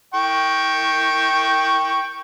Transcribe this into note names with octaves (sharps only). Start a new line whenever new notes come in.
G5 C#6